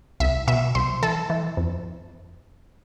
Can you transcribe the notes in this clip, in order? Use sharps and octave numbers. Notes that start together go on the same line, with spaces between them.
C2 E5
B2 E5
C2 C5
E3 A4
E3
F2